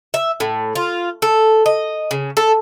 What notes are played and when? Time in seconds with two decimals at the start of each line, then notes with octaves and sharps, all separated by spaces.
0.14 E5
0.40 A2
0.75 F4
1.22 A4
1.66 D#5
2.11 C#3
2.37 A4